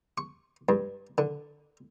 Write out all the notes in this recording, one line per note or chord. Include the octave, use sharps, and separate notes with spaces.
C#6
G2
D3